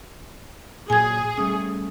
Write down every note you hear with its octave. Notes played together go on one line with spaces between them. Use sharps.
A#2 F#3 G#4 G#5 G#6
G3 A3 C#4 D#6